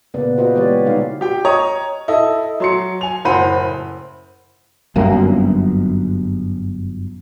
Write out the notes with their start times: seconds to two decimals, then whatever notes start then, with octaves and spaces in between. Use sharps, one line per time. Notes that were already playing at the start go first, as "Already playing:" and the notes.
0.14 A#2 C#3 A#3 B3 B4 D5
0.38 F4 F#4 B4 C5 D#5 F5
0.55 E3 G#3 B3 G4 C#5 D5
0.85 B2 D3 G3 D#4 A4 F5
1.21 G4 G5
1.45 C#5 D#5 A#5 D#6
2.08 E4 A4 D#5
2.60 F#3 C6 C#7
3.01 G#5 F7
3.25 F#1 A2 C5 F#5 B5 D#7
4.96 G1 F#2 A#3